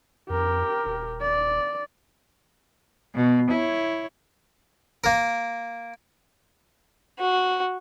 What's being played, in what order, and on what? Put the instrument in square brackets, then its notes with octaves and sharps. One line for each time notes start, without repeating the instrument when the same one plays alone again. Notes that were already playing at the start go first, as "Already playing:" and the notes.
[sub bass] F2 [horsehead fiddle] G4 A#4
[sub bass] D#1
[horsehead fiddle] D5
[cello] B2
E4 C#5
[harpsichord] A#3 A#4
[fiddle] F#4